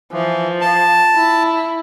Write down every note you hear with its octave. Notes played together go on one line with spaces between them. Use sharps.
E3 F3
A5
E4